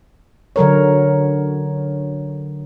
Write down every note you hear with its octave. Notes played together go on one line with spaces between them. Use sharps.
D3 F#3 A#4 C#5